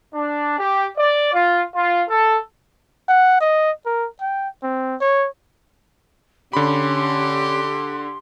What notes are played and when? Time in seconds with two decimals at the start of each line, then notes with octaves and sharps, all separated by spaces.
0.13 D4
0.58 G4
0.97 D5
1.32 F4
1.74 F4
2.08 A4
3.09 F#5
3.41 D#5
3.86 A#4
4.21 G5
4.63 C4
5.01 C#5
6.53 D3 C#4 G4 B5 C6